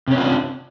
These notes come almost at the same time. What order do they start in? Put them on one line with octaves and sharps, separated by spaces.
C3 C#4 B3 F4 D4